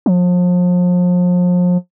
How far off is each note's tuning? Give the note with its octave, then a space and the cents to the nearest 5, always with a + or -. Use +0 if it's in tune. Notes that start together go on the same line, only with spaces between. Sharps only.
F3 +35